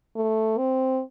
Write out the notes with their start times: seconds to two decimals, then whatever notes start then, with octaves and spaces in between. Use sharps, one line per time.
0.16 A3
0.58 C4